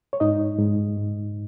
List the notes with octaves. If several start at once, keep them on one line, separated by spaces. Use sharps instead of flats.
C#5
G#2 D#4 D#5
G#2
G#2